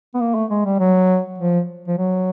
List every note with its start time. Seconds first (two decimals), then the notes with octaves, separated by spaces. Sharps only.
0.15 B3
0.21 A#3
0.35 A3
0.50 G#3
0.65 G3
0.79 F#3
1.39 F3
1.88 F3
1.98 F#3